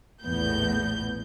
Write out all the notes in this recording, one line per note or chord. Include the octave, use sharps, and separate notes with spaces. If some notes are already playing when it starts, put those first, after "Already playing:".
A#1 E2 A2 B3 G6